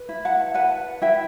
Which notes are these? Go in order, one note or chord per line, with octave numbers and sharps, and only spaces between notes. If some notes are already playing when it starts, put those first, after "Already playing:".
Already playing: B4
E4
F#5 A5
B4 F#5 A5
E4 E5 G5